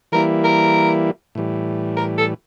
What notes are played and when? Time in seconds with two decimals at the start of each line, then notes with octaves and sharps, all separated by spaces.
0.12 E3 G3 A#3 E4 A#4
0.44 A#4
1.35 A2 E3 G3
1.96 A#4
2.18 A4